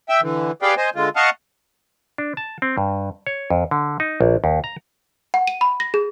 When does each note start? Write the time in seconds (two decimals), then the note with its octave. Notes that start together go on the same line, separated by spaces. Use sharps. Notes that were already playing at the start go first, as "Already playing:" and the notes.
0.09 E5 G5 E6
0.22 D3 E3
0.62 G4 G#4 B4 D5 F5 G5
0.77 C5 D#5 G#5
0.95 D3 G#3 F4
1.16 D#5 F5 F#5 A5 C#6 F6
2.18 D4
2.37 A5
2.62 C4
2.78 G2
3.27 C#5
3.50 F2
3.71 D3
4.00 D#4
4.21 A#1
4.44 D#2
4.64 A#5
5.34 F#5
5.47 D#7
5.61 B5
5.80 A#6
5.94 G#4